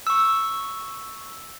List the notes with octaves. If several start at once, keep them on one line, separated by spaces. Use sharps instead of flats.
C#6 E6